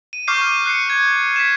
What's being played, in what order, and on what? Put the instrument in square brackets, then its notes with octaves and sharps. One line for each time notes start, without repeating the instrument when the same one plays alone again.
[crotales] D#7
C#6 D6 F6 G6 C7 D#7
F6
F#6 C7 C#7
G#6
B6 E7